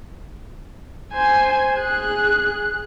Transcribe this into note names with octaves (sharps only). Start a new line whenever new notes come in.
C5 G#5
G#4 F#6